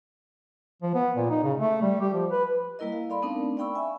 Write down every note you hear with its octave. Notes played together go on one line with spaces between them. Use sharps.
F3
B3
A#2
D#4
C#3
A3
G3
G4
F3
B4
G3 A#3 E4 A#4 D#5
F5
A4 D5 F5 B5 C6
A3 B3 C4 D4 D#4 A#4
D5 F5 G5 B5 C#6 E6
E5 G#5